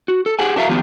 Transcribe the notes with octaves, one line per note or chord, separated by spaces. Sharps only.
F#4
A4
G4 G#4 F#5 G#5
D4 F#4 A#4 E5 F5 A#5
D#3 F3 B3 F4 G4